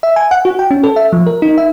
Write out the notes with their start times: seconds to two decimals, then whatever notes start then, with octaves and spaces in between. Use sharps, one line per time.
0.03 E5
0.16 G#5
0.31 F#5
0.45 F#4
0.59 G5
0.71 C#4
0.83 A4
0.96 E5
1.13 F3
1.26 A#4
1.42 D#4
1.58 E5